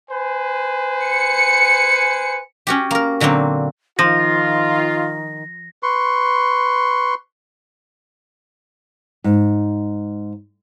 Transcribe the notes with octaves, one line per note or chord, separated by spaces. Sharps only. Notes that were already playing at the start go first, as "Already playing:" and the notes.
B4 C5 G#5
C#7
C#4 F#4 G4
A#3 A#4
A#2 D3 F#3 A#3 C4
D#3 F3 F4 A#6
B4 C6 C#6
G#2